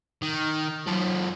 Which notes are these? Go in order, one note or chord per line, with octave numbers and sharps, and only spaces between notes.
D#3
F#2 A4